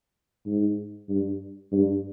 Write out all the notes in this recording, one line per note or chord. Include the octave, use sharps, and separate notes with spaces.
G#2
G2
G2